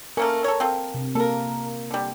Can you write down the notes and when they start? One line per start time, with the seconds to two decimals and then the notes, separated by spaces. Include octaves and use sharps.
0.17 A3 A#3 C#4 A#4
0.44 A4 C#5
0.60 C4 F4 A4
0.94 C3
1.15 A#3 A4 A#4
1.91 D3 G3